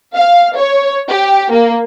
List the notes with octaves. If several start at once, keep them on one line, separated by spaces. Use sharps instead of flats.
F5
C#5
G4
A#3